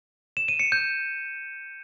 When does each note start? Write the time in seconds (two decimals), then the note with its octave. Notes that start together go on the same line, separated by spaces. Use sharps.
0.37 E7
0.48 D#7
0.59 C#7
0.72 G6